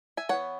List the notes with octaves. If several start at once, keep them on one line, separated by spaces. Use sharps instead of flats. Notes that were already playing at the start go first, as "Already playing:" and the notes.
E5 G#5
E3 B3 C#5 F#5